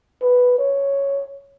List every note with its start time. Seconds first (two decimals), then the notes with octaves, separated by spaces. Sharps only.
0.22 B4
0.59 C#5